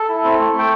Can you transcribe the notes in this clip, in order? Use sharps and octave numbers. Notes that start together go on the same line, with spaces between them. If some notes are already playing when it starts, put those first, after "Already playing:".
Already playing: A4
E4
C4
A3
A3 G5